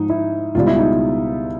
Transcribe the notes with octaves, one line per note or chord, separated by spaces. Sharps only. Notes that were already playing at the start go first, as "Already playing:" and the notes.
Already playing: G#2 F3 D#4
E4
C#2 B2 G3 F4
E4
D#4